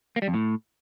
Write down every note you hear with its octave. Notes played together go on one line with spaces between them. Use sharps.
A#3
G3
F2
A2